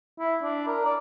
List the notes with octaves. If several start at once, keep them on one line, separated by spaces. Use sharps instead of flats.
E4
D4
A#4
D5